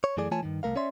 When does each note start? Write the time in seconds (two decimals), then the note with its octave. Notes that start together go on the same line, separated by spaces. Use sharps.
0.04 C#5
0.17 F#2 E3 A3 G#4 D5
0.31 E3 A3 F4 C#5 G#5 A5
0.43 G2 D#3
0.63 C2 A3 A#4 F5
0.76 C#4 C#5 D5 E5 C6